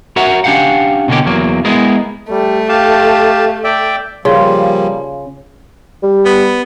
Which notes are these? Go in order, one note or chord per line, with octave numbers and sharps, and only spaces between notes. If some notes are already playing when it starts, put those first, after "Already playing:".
F#4 A#4 C#5 E5 F#5 A#5
C#4 D4 G4 F5 F#5
B2 D3 A#3 C#4 G4
E2 F#3 A#3
G#3 B3 E4 G#4 A#4
G3 A3
G4 F5 A5
D5 E5 G5
C#3 F3 G3 A#3 F4
G3
B3